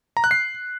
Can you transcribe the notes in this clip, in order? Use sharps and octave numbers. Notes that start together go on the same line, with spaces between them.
A#5
F#6
C7